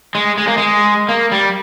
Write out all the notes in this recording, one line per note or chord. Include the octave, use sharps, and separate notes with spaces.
G#3
G#3
A#3
G#3
A#3
G3